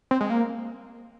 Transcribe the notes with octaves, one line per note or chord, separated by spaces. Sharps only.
C4
G#3
A#3